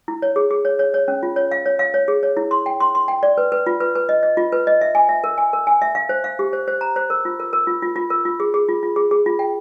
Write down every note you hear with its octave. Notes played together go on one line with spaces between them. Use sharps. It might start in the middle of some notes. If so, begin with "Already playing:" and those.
E4
C#5
G#4
G#4
C#5
C#5
C#5
C#4
F4
C#5
F5
C#5
F5
C#5
G#4
C#5
E4
C6
G5
C6
C6
G5
D5
B4
B4
F4
B4
B4
D#5
D#5
F4
B4
D#5
E5
G#5
E5
A#4
G#5
A#4
G#5
E5
F5
C5
F5
G4
C5
C5
A#5
C5
A#4
F4
A#4
A#4
F4
F4
F4
A#4
F4
G#4
G#4
F4
F4
G#4
G#4
F4
G5